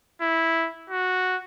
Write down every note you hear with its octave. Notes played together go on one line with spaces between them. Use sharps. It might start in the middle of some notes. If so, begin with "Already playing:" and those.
E4
F#4